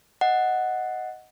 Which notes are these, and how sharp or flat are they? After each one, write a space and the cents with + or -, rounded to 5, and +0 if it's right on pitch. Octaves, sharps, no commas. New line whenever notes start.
D#5 +5 F#5 +0